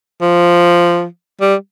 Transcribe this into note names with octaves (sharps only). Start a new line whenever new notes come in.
F3
G3